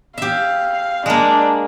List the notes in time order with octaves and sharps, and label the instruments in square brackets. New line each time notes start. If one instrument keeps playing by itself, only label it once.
[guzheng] G4 E5 [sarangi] F5
[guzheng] G#3 A#3 [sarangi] D4